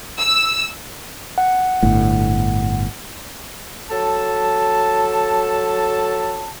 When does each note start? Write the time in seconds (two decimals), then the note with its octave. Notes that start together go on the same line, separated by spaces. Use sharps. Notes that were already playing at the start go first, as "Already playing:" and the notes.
0.19 E6
1.38 F#5
1.83 G1 A2
3.90 F#3 A4 A5